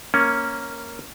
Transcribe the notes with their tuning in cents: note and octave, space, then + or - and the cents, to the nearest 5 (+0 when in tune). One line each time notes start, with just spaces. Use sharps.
A#3 +0 C#4 +0